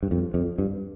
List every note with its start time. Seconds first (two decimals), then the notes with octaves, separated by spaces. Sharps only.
0.03 G2
0.11 F2
0.34 F2
0.58 G2